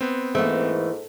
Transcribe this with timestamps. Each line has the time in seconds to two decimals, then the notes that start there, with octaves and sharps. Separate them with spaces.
0.01 B3 C4
0.35 G#2 E3 A3 A#3